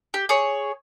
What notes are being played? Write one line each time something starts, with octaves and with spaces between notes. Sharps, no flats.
G4
G#4 C#5